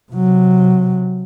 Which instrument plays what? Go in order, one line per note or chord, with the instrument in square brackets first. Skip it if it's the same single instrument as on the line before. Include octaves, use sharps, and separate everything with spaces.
[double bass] C3 F#3